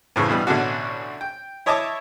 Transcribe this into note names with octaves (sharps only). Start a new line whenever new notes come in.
F2 A2 C#3 E3
G2 B2 E3 G3
A1 B2 D3 C#4 D4 F#4
G5
E4 C#5 D#5 A5 C#6 D6